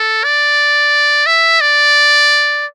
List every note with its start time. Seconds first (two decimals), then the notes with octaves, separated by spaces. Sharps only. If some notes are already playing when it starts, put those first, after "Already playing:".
Already playing: A4
0.24 D5
1.27 E5
1.61 D5